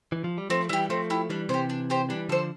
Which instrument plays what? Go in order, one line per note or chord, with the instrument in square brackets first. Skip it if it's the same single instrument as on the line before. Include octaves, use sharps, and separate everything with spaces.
[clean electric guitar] E3
F3
G3
[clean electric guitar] F3 A3 [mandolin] C4
[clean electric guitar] E3 G3 [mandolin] E4 G4
[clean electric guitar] F3 A3 [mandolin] C4
[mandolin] E4 G4
[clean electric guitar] E3 G3 [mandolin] D4
[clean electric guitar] C3 E3 [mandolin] G4 C5
[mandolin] D4
G4 C5
[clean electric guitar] E3 G3 [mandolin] D4
[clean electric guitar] D3 F3 [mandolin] A4 C5